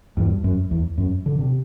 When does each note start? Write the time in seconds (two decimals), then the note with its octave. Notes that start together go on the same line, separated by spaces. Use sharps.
0.17 E2 G2
0.44 F#2
0.71 E2
0.98 F#2
1.26 D3
1.39 C3